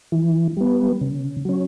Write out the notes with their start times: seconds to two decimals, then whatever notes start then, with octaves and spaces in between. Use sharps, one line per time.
0.12 E3
0.57 G3 B3
1.01 C#3
1.45 F#3 C#4